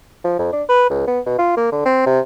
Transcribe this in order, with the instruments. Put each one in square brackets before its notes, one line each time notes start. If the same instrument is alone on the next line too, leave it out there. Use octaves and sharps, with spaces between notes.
[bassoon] F3
F2
D4
B4
C#2
B3
B2
F4
A#3
D3
C4
C3